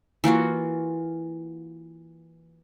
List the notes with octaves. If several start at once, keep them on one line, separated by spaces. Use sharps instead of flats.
E3 A#3 F4 F#4